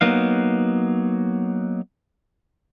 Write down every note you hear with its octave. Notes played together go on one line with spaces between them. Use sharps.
F#3 A#3 B3 D#4 F5